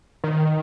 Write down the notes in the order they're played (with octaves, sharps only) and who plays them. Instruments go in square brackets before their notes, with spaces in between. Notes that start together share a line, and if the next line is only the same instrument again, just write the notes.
[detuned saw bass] D#3